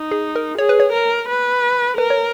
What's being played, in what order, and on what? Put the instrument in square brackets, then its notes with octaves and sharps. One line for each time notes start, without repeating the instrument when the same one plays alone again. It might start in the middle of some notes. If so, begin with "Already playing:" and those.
Already playing: [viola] D#4
[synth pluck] G#4
A#4
[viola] G#4 [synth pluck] C#5
[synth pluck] B4
C#5
[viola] A#4
B4
[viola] A#4 [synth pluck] B4
[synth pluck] C#5